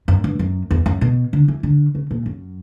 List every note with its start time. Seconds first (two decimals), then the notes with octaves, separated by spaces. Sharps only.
0.08 F#2
0.24 G2
0.39 F#2
0.71 E2
0.86 F#2
1.01 B2
1.33 D3
1.48 E3
1.63 D3
1.95 C#3
2.11 A#2
2.26 F#2